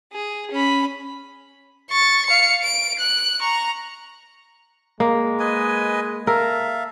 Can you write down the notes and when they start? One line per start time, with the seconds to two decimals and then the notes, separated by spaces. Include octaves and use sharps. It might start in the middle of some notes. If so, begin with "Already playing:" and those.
0.13 G#4
0.51 C#4 B5
1.91 C#6 A6
2.26 F5 C#7
2.63 D7
2.99 F#6
3.41 A#5 C#6
5.00 G#3 A#3
5.39 B4 D#5 G#5
6.27 A4 A#4 E5 F5